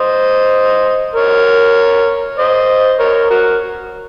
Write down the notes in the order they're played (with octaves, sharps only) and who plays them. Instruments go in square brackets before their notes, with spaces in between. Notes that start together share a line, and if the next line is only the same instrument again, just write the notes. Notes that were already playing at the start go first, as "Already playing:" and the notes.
Already playing: [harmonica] C5 D#5
A#4 C#5
C5 D#5
A#4 C#5
F#4 A#4